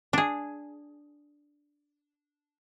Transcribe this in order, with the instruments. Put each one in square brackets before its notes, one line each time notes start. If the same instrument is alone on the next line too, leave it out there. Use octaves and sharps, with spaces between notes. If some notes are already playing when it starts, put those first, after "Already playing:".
[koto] D4 G#4